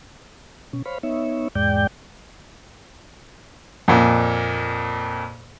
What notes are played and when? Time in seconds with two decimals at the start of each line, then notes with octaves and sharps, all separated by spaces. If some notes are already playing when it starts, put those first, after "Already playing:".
0.73 B2 C#4
0.86 C5 C#5 F5 B5
1.03 B3 D#4 C#5 E5
1.55 E2 G#2 G#3 D5 G5 G6
3.88 F2 A#2